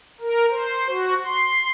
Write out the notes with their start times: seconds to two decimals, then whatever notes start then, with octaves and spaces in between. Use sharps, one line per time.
0.21 A#4
0.50 C5
0.89 F#4
1.25 C6